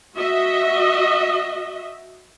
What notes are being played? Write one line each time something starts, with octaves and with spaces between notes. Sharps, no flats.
F#4 D#5 E5